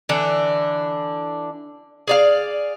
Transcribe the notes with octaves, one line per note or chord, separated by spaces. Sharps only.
D3 E3 D4
G#4 D5 F5